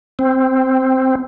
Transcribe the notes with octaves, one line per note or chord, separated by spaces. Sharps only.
C4